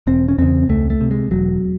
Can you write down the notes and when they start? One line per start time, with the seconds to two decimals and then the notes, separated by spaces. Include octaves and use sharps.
0.07 E1 C4
0.28 C#4
0.38 E2 C#3 C4
0.69 C#2 A3
0.90 A3
1.01 C3
1.11 G#3
1.31 E1 F#3